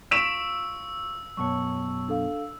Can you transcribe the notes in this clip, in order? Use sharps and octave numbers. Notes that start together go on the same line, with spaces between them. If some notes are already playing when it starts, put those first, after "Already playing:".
F4 C#6 E6 B6 D7 E7
F#2 B2 C#5 A5 C#6
D4 A4 F5